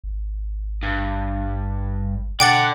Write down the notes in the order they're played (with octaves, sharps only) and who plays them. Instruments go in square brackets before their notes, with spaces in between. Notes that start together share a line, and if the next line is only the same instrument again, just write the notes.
[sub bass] G#1
[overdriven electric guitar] G2
[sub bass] B2 [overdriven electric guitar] A4 D5 [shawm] F#5 [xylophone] G5 D6 A6